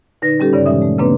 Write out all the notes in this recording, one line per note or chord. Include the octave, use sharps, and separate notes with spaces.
A#2 D3 D#4 B4 A#6
G3 C#4 G4 A4
G2 C#3 D5
A#2 E3 G#3 C#4 E5 D#6
A3
C#3 A#3 C4 D4 B4